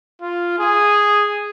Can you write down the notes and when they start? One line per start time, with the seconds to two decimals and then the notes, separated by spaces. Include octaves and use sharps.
0.22 F4
0.59 G#4